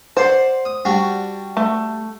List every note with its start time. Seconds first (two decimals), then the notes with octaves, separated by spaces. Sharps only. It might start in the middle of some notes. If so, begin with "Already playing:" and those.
0.17 C5 D5 F#5 C6
0.65 D#6
0.85 G3 D4 F#4
1.57 A3